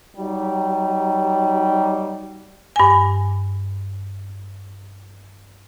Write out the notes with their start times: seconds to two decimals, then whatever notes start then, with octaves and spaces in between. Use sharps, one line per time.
0.17 F#3 G3 D#4 G4
2.76 G2 G#5